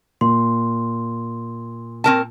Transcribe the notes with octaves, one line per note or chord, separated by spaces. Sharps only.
A#2 C6
C4 A#4 A5